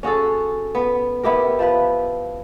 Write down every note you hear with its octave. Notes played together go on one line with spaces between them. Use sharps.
C#4 F#4 G#4 A4
B3
B3 E4 G4 A#4
F3 E4 B4